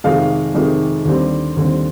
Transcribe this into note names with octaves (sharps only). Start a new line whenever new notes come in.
F2 C3 D#3 G#3 F5
F2 C3 D#3 G#3
D#2 D3 G3 C4
D#2 D3 G3 C4